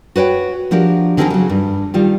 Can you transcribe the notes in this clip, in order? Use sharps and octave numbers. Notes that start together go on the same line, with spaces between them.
F#4 B4 C#5 G5
F3 D4 F#4 G4 A#4
D3 D#3 C4 F#4 G#4 A#4
C#3 F#3
G2
D#3 G3 F4